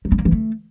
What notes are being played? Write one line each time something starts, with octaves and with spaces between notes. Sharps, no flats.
F#3
B3
A#3
E3
A3